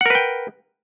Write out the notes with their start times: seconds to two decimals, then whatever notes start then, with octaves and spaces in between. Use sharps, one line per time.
0.01 F#5
0.06 A#4
0.10 B4
0.15 G5